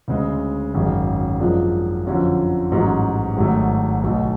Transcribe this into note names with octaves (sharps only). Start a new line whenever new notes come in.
D2 C#3 G#3
G#1 F#2 C#3 G#3
F#2 F3 G#3 D4
F2 D3 F#3 C#4 F4
A1 G#2 F#3 C#4
G#1 G#2 F#3 A3
B1 B2 A3